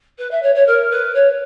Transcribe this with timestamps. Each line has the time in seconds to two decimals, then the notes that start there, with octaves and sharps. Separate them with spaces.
0.18 B4
0.31 E5
0.42 C#5
0.55 C#5
0.67 A#4
0.91 B4
1.15 C#5